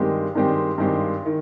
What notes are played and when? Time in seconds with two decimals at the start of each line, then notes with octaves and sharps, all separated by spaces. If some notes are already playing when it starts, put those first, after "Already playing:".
Already playing: G2 D#3 G#3 C4 G4
0.35 G2 D#3 G#3 C4 G4
0.78 G2 D#3 G#3 C4 G4
1.26 D#3